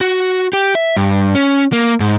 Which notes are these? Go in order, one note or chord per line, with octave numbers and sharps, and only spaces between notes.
F#4
G4
E5
G2
C#4
A#3
G#2